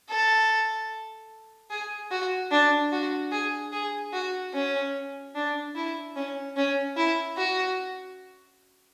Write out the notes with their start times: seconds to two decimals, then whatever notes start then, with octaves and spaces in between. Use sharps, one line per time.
0.09 A4
1.70 G#4
2.11 F#4
2.51 D4
2.92 F#4
3.32 G#4
3.72 G#4
4.13 F#4
4.53 C#4
5.35 D4
5.75 E4
6.16 C#4
6.56 C#4
6.96 E4
7.37 F#4